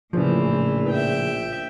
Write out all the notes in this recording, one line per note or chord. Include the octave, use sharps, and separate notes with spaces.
A#1 A2 C#3 E3 F3
E5 G5